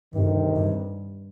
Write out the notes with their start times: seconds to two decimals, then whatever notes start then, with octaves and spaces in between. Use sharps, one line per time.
0.14 D2 G2 C3 D#3
0.56 G2